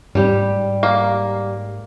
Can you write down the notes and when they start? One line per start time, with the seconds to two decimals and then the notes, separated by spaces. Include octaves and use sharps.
0.15 G#2 G3 G4
0.83 A#3